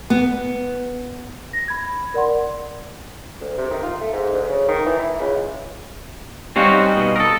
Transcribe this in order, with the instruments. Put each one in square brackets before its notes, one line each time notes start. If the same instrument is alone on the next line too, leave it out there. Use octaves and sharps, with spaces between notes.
[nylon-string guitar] B3
[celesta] A#6
B5 G#6
A#4 D5 F#5 C6
[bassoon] D2
C3
D#3
F4
A3
G#2
D2
C#3
D#3
E3
E4
C#2
[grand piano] G3 D#4 F5 [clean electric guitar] C4 C#4 F#4
[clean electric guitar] B2
[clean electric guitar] A4 A#4 [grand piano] D#6